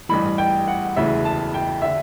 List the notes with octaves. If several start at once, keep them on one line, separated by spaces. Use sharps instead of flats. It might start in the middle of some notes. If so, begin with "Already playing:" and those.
A1 G2 E3 B5
G5
F#5
E1 D2 C#3 E3 E5
A5
G5
D3 E5